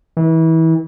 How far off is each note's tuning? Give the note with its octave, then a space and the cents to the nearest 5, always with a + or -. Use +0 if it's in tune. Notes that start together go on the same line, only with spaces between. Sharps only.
E3 -30